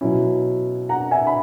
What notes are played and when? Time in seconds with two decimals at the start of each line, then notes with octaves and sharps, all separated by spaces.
0.01 B2 F#3 C#4 E4
0.89 F#5 A#5
1.11 E5 G#5
1.27 B5